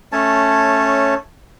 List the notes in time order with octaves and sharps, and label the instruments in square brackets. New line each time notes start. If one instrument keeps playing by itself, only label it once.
[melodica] A3 C#4 C#5 A5